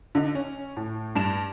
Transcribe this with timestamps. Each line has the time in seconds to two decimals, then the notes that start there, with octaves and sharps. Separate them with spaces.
0.15 D3 D#4
0.35 C#4
0.77 A2
1.16 G2 E7